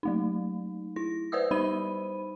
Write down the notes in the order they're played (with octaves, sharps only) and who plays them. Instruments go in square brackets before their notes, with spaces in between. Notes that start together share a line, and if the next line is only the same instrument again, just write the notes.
[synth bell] F#3 A3 D#4
E4 A#6
B4 C5 D5 E5 D#6 E6
G3 D#4 C5 B5 D#7